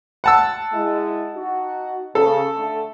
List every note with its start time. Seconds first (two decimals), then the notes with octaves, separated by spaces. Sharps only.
0.24 F#5 A5 E6
0.73 G#3 E4
1.35 D#4 F#4
2.15 C#3 A4
2.57 D3 A3